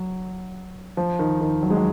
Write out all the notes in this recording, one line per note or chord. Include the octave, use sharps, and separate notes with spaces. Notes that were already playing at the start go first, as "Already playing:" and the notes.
Already playing: F#3
F3
D#3
D#3
F#3
G#3
F#3